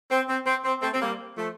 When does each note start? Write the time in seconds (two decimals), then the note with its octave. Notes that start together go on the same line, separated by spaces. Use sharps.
0.10 C4
0.28 C4
0.45 C4
0.63 C4
0.81 A3 C4
0.94 C4
1.01 G3 A#3
1.37 F3 A3